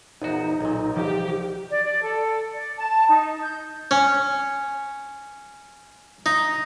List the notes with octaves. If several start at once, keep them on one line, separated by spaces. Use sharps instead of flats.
A#1 E2 D#4 F#4
B1 A#2
C2 F3 G4
D5
D5
A4
D5
A5
D#4
G6
C#4
D#4